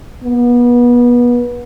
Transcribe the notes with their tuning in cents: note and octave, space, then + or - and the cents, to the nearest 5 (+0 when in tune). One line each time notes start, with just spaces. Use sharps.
B3 -30